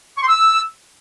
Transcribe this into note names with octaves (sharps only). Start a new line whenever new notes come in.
C#6
C6
E6